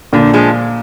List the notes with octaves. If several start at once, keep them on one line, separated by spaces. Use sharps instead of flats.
A#2 D3
F3 G#3